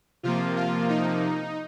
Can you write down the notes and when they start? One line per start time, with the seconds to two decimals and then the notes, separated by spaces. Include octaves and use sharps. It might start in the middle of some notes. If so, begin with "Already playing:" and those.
0.23 C3 F3 A#3 F4
0.56 F4
0.89 D#4